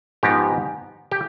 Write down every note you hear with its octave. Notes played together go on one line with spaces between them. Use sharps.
G#2 F3 B3 D#4 G4
G4